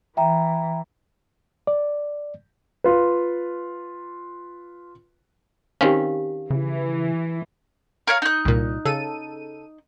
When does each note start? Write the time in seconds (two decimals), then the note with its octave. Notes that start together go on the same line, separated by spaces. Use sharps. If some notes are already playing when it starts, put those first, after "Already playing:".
0.17 E3 E5 G5 A#5
1.67 D5
2.84 F4 B4
5.81 D#3 C4 C#4 G4 F5
6.50 C#3 E3
8.07 A#4 C#5 F5
8.22 D#4 F#6
8.45 C2 A#2
8.85 C#3 A4 D#7